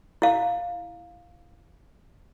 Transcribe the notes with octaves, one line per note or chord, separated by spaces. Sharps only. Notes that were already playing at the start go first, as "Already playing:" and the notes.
E4 F5